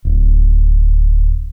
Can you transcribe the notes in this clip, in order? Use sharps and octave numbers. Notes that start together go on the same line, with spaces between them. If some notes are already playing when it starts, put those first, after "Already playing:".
D1